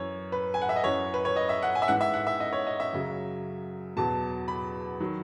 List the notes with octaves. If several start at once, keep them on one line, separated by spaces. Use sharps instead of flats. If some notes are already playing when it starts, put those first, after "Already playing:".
Already playing: F#2 E3 C#5
B4
G#5
F#5
E5
D#5
F#2 E3 C#5
B4
C#5
D#5
E5
F#5
G#5
E5
G#2 E3 F#5
E5
F#5
E5
D#5
C#5
D#5
E5
F#2 C#3 F#3
E2 B2 F#3 A5
B5
D#3 F#3